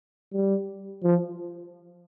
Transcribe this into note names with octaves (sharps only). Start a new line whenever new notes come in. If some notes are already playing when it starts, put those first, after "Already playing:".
G3
F3